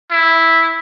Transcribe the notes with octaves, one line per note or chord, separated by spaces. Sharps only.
E4